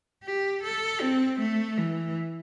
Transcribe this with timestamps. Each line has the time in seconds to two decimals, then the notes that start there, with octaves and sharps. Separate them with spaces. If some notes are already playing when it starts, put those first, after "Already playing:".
0.23 G4
0.63 A4
1.01 C4
1.39 A3
1.78 E3